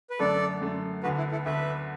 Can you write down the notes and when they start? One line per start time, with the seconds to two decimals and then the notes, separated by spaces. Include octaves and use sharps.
0.10 B4
0.19 F#2 D3 A3 A4 D5
0.62 F#2 D3 A3
1.03 D2 D3 B3 F#4 B4
1.18 E4
1.31 E4 A4
1.46 D2 D3 B3 B4 E5